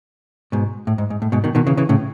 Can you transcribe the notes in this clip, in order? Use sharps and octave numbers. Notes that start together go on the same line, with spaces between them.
G#2 B2
A2
G#2
G#2
A2
G#2 B2
B2 D#3
B2 D#3
C#3 E3
C#3 E3
A2 C#3